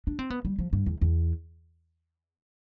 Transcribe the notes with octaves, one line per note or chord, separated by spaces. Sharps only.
D4
C4
B3
G3
F3
G2
E2
E2